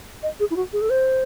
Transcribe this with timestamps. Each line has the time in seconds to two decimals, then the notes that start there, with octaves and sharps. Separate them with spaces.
0.23 D#5
0.40 G#4
0.51 E4
0.56 F#4
0.73 G#4
0.81 A4
0.90 C5